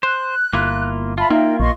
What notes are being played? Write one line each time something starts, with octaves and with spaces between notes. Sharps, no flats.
C5 F#6
G1 A#3 E4 F4
F4 E5 A5 B5
A#3 D#4 A#4 E5 G5
A#1 D#5 C6 C#6